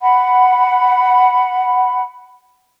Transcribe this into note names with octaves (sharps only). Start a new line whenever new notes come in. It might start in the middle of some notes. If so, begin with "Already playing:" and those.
F#5 B5